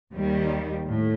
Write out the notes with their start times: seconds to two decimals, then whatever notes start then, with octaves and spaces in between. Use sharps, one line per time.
0.12 D#2 D#3 G3
0.85 A2